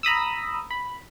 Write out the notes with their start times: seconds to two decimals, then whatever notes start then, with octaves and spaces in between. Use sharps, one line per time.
0.03 A#5 B5 D#6 E6
0.71 B5